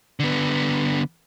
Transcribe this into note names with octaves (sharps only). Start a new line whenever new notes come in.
D3 B3